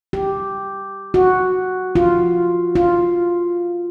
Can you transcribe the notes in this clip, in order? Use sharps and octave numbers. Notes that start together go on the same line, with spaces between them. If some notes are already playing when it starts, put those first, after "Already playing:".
G4
F#4
F4
F4